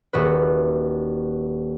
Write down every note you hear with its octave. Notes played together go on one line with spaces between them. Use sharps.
D#1 F#4 B4